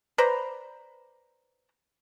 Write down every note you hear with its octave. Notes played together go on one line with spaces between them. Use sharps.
B4 C5 D5 A#5